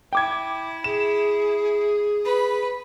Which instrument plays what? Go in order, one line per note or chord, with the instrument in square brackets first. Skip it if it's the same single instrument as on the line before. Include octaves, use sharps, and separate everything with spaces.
[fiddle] E4 [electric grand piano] G5 D6 G#6
[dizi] G#4 [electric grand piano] E7
[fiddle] B4 B5